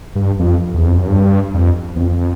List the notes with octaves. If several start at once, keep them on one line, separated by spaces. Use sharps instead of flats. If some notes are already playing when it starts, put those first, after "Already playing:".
G2
F2
E2
F2
F#2
G2
F2
E2
F2